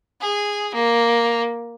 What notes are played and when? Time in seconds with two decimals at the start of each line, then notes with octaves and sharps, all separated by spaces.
0.21 G#4
0.74 A#3